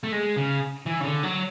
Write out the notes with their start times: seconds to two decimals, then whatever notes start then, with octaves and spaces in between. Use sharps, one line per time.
0.04 A3
0.12 G#3
0.36 C#3
0.86 E3
1.00 C#3
1.04 D3
1.23 F#3